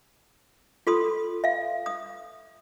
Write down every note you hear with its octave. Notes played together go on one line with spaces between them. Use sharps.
F4 A4 C6 D#6
E5 F5
D#6